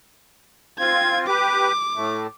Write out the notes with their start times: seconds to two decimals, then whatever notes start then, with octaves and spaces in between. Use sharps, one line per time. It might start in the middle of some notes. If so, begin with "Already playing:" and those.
0.79 C4 F4 G#6
1.27 G4 B4 D6
1.96 A2 A3